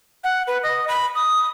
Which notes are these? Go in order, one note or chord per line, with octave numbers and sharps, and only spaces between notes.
F#5
B4
D#5
B5
D#6